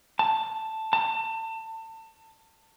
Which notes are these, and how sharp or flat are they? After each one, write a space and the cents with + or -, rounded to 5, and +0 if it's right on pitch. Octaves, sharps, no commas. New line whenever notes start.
A5 +5
A5 +30